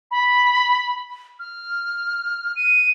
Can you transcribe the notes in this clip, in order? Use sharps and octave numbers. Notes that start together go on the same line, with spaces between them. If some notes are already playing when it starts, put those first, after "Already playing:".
B5
F6
D#7